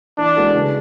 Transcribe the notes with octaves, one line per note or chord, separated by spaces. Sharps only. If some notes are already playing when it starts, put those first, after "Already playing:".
E3 D4
G#3 B3 F#4 A4
C#3